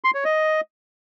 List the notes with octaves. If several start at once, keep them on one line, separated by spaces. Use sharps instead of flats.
C6
C#5
D#5